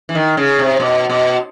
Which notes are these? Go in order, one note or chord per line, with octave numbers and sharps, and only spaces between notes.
E3
D#3
C#3
C3
B2
B2